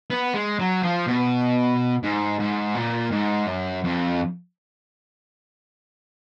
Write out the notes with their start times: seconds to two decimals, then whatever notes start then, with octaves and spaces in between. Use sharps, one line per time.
0.10 B3
0.34 G#3
0.59 F#3
0.83 F3
1.07 B2
2.03 G#2
2.39 G#2
2.75 A#2
3.12 G#2
3.47 F#2
3.84 F2